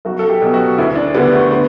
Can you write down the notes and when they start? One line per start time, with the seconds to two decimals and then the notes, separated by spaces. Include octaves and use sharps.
0.05 B1 F#4
0.19 A4
0.30 G4
0.42 B2 F#3 G4
0.54 F#4
0.78 D2 E4
0.96 D4
1.14 D3 G3 B3
1.32 A3
1.51 B3